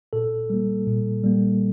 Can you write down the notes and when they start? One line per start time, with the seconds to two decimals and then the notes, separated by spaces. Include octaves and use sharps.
0.13 A#2 A4
0.50 G3 A#3
0.87 A#2
1.24 G3 A#3